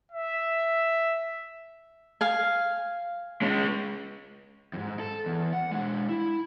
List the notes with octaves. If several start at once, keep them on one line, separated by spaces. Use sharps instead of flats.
E5
F5 G#5
G#3 C#4
F2 G#2
A4
E2
F#5
G#3 D4
E4